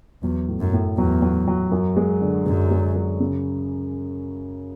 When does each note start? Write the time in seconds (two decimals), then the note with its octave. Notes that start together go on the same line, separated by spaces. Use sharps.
0.23 E2 F#3
0.48 A2
0.60 F#2
0.73 A2
0.98 E2 F#3
1.22 F#3
1.47 F#3
1.71 F#2
1.96 G#3
2.21 D3
2.46 F#2 G#3
2.71 G#3
2.95 F#2
3.20 C#3